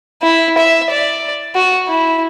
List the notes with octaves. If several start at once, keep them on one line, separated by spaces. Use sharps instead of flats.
E4
E5
D5
F#4
E4